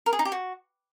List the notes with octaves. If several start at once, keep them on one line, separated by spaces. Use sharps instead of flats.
A#4
G#4
D#4
G4
F#4